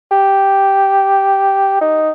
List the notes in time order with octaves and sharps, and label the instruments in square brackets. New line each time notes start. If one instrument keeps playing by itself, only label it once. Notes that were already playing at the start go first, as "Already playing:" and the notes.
[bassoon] G4
D#4